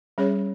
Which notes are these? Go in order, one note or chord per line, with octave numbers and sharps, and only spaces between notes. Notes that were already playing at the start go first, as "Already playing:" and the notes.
G3 C#4 G#4 C#5 E5